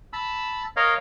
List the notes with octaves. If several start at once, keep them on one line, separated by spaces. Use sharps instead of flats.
A5 B5 E6
A#4 C#5 D#5 F5